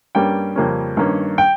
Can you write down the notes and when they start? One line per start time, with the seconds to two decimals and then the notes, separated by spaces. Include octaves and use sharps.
0.15 G2 G3 A#3 C#4 G5
0.56 F2 C#3 G3 A#3 C#4
0.97 G2 D#3 A#3 C#4
1.38 G5